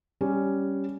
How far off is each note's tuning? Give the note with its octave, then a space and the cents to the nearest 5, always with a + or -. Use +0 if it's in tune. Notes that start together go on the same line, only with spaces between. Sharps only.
G3 +0 C#4 +0